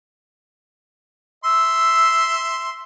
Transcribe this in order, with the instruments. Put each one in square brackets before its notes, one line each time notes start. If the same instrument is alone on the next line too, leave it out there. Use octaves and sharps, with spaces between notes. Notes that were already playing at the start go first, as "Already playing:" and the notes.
[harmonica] E5 C6 [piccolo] E6